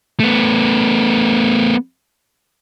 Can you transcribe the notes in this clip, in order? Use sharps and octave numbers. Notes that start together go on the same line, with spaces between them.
A3 B3